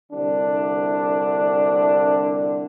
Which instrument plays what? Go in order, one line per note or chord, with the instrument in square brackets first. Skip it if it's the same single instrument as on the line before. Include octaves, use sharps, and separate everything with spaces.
[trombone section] C2 D3 D4